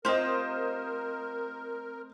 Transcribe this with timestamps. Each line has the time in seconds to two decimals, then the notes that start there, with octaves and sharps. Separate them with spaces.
0.05 A3 C4 F4 G4 A#4 C5 D#5